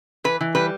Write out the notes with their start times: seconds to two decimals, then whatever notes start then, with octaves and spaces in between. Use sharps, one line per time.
0.24 E3 B4
0.41 E3
0.55 G3 B4